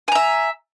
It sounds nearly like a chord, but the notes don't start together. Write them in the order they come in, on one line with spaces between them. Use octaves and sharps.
G#5 A#5 E5